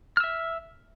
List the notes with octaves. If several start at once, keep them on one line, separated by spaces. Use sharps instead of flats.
E5 E6 F6